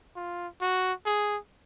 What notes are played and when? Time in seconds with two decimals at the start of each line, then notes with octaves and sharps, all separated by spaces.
0.16 F4
0.61 F#4
1.06 G#4